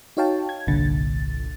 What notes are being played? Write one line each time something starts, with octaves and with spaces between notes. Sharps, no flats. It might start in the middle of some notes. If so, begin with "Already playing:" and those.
D#4 F#4 C#5 F5 G5 A5
G#6
G1 C2 A#2 D3 A6